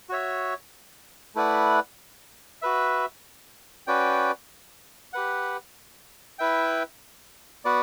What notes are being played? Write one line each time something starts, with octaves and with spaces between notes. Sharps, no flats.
F#4 C#5 E5
A3 E4 B4 D5 F#5
F#4 B4 E5
C#4 F#4 B4 D5 G5
G4 B4 F#5
E4 B4 E5 G5
B3 F#4 B4 D5 F#5